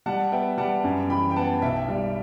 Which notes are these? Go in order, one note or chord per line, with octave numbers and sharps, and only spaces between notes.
G3 F#5 A5
B3 E5 G5
G3 F#5 A5
F#2
E3 G5 B5
G5
B3 F#5 A5
B1 E5 G5
G3